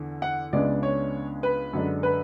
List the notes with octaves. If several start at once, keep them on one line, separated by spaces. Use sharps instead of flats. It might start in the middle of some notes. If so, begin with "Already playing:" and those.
Already playing: E2 D3
F#5
C#2 C#3 G#3 B3 D4 D5
C#5
B4
F#2 D3 G#3 D4
B4